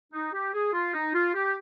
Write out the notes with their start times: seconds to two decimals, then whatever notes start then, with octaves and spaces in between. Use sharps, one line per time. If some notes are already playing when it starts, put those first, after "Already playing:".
0.12 D#4
0.33 G4
0.53 G#4
0.73 F4
0.94 D#4
1.14 F4
1.34 G4